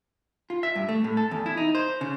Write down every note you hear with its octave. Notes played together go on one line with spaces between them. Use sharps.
F4
E5
G2
A3
A2
A4
E2
E4
D#4
C5
C#3